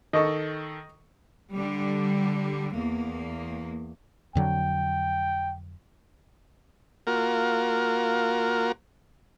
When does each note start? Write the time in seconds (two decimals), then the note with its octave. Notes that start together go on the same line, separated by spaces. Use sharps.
0.13 D#3 A4 D#5 C#6
1.53 D3 G3
2.76 E2 A#3
4.35 F2 D3 F#3 G5
7.07 A#3 F4 F#4 A#4